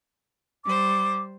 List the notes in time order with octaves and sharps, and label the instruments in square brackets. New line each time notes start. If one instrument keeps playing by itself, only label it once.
[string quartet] G3 C5 [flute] D6